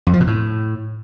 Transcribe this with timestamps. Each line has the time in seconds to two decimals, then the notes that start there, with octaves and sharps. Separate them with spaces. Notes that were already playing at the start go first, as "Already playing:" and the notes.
0.07 F2
0.13 F3
0.20 B2
0.27 A2